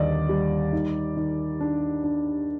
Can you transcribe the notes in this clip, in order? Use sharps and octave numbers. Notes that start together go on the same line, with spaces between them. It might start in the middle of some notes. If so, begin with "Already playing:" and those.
Already playing: D#2 D3 G3 D5 D#5
G3
D#3
D#3
D4
D4